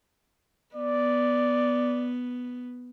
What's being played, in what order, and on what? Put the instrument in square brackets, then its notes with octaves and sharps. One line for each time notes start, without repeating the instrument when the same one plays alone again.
[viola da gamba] B3 [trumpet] D5